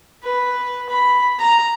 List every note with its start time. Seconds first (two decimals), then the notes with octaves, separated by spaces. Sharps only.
0.23 B4
0.89 B5
1.39 A#5